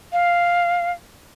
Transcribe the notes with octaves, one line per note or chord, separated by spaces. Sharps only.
F5